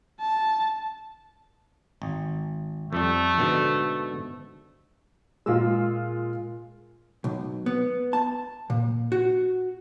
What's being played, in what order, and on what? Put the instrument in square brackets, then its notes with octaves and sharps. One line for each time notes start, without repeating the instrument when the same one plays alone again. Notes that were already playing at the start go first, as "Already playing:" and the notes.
[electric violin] A5
[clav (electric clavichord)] G#1
[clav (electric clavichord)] F2 G3 [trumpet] A3
[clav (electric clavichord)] G#2 B2 D3
[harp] A#2 E6 [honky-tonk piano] G#3 F4
[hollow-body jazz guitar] B1
B3
A5
A#2
F#4